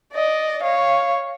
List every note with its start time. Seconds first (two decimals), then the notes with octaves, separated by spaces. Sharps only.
0.13 D5 D#5
0.63 C#5 F5